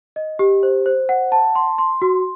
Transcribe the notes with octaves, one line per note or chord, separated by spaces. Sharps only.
D#5
G4
C5
C5
F#5
A5
C6
C6
F#4